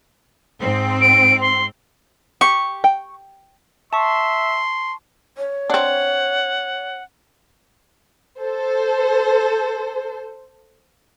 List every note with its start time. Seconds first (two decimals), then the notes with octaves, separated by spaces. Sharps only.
0.60 G#2 C4
1.01 D7
1.41 C6
2.41 G4 C#6
2.84 G5
3.93 E5 A5 C6 C#6
5.37 C#5
5.70 C4 D4 F#5
8.41 A4 C5